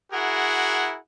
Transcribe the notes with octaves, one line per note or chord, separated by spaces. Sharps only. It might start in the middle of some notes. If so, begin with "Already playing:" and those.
E4 F#4 G#4 A#4 F#5